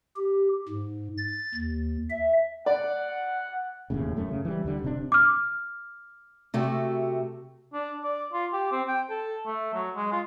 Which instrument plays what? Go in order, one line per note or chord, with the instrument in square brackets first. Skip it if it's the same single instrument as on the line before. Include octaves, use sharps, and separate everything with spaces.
[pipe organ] G4
G#2
A6
D#2
E5
[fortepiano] D5 [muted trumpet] F#5
[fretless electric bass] E1 D#2 A2 C#3
F#2 A3
C#3
E3 G3
D#2 D3 G3
D1 C3 A#3 D4
[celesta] D6 F6
[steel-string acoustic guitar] C3 A3 F#4
[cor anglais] D4
D5
F4
G4
C4
G5
A4
A3
F#3
G#3
F4